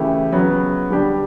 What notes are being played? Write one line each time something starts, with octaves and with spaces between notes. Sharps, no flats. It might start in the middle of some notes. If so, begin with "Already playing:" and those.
Already playing: C#3 E3 A3 E4 G4
C#3 F#3 B3
D3 G3 D4 G4